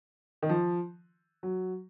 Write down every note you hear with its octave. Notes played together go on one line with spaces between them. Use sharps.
D#3
F3
F#3